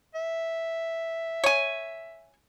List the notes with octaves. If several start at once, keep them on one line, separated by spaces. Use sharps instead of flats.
E5
C#5 G#5